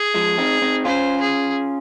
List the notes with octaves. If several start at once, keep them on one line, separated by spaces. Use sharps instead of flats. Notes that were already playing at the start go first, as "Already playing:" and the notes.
Already playing: G#4
F3 G#3
C4 D#4
C4 D#4
C#4 F4 C5
G#4